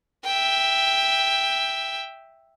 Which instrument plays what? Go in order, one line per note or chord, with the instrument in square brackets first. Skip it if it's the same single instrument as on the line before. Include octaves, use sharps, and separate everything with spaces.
[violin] E5 G5